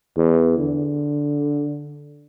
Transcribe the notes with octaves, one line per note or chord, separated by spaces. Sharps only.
E2
D3